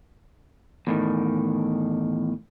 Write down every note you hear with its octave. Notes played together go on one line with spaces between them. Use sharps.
E2 A2 D#3